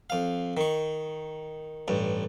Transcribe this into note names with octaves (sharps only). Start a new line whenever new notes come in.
F2 F5
D#3 C#6
A1 G2